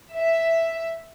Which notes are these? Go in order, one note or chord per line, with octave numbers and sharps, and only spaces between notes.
E5